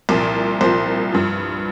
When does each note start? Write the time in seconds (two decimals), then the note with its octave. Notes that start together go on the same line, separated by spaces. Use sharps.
0.09 C2 A#2 F3
0.61 C2 A#2 F3 C5
1.12 G2 F3